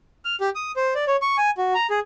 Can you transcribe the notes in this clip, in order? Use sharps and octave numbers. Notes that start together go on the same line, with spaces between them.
F6
G4
D#6
C5
D5
C#5
C#6
G#5
F#4
A#5
G#4